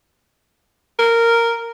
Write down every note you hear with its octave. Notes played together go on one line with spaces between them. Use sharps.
A#4